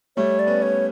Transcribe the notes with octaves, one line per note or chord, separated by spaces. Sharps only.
G3 A3 C#5
D5
B3 C#4
C#5